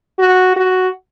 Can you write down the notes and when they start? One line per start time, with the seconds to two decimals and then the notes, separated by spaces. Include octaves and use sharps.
0.19 F#4
0.56 F#4